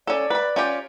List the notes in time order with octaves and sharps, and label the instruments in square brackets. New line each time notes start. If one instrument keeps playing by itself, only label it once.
[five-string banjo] C#4 A4 [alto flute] D5
[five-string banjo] B4 B5
C#4 F4 G4